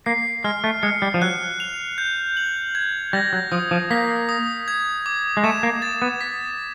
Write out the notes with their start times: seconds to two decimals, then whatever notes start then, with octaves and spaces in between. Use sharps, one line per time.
0.06 A#3 C7
0.44 G#3 F6
0.64 A3
0.83 G#3 C#7
1.02 G3
1.14 F3
1.22 F#3 F#6
1.60 F7
1.98 G6
2.37 F#7
2.75 G#6
3.13 G3 A#6
3.33 F#3
3.52 F3 D#6
3.71 F3
3.91 A#3 B6
4.29 D#6
4.68 G#6
5.06 D6
5.37 G#3
5.44 A3 E7
5.63 A#3
5.82 A6
6.02 B3
6.21 B6